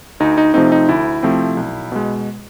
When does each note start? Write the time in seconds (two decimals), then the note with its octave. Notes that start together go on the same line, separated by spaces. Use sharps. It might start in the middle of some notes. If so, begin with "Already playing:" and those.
0.20 D2 D#4
0.38 D#4
0.54 C3 F3 A3 C4 D#4
0.72 D#4
0.89 D2 E4
1.23 C3 F3 A3 C4
1.57 B1
1.92 B2 G#3